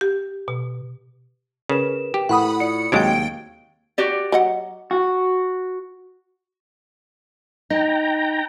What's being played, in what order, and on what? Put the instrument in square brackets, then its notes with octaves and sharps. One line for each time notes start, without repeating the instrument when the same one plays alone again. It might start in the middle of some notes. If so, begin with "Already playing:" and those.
[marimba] G4
B2
[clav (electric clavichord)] C#3 [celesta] A#4 B4 E7
[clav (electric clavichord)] G4
[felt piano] A2 [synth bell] F#5 B5 D#6
[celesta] F4 D5 B5 [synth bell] C#7
[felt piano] D#2 A6 [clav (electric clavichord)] C3 F#3 G#3 [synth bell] G5 D7 [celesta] G#6
[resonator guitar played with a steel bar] F#4 G4 D5
[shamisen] F#3 D#5 F#5
[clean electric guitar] F#4
[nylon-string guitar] D#4 [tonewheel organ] G5 A#5